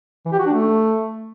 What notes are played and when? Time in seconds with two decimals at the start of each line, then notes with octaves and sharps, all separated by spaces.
0.25 E3
0.32 G4
0.39 F#4
0.46 D4
0.53 A3